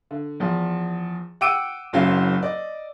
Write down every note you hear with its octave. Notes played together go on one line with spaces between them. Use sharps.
D3
E2 F3
F#5 G5 D6 E6 D7 D#7
F#1 F#2 F#3 C4 F5
D5 D#5